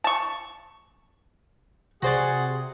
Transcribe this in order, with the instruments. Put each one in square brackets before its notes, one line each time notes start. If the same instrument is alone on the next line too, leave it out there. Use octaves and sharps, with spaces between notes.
[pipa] A5 C#6
[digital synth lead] C3 [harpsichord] F#4 C5 D5 [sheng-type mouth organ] G#4 F#5